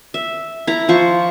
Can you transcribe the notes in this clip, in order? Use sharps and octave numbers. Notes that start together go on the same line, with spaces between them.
E5
E4 A#5
F3 C5 C#6